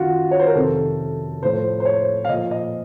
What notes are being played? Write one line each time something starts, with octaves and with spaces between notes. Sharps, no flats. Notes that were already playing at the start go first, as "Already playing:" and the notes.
Already playing: F#2 D#3 F4 F#4
C#5
C5
A#4
F2 C3 D#3 A4
A2 F3 C5
C5
C#5
F5
A#2 F3 D#5
D#5